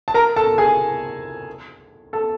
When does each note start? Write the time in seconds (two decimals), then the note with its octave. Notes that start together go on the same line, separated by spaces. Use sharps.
0.08 A5
0.14 A#4 A#5
0.36 A4 A5
0.58 G#4 G#5
2.13 A4 A5